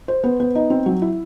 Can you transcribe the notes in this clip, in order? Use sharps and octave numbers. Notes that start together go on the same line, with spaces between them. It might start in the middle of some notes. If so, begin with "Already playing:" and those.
C5
B3
B3
D#4
C4
F#3
E4